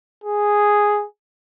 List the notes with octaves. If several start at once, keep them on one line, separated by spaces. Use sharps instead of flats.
G#4